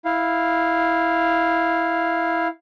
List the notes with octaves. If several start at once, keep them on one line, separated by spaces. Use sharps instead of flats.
E4 F5